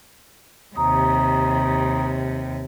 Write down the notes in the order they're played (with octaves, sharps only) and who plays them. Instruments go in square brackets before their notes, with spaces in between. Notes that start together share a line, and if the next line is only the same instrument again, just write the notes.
[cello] D#2 C3 [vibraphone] A#5 D#6